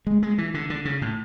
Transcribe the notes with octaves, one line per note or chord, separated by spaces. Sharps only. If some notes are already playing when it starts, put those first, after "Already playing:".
G#3
G#3
E3
D3
D3
C#3
A2